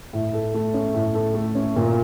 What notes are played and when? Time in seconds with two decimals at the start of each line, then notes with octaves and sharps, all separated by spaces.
0.13 A2
0.33 A4
0.54 A3
0.74 C#4
0.94 A2
1.14 A4
1.35 A3
1.55 C#4
1.76 A#2